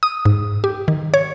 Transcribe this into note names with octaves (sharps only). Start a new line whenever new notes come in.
D#6
G#2
G4
D#3
C#5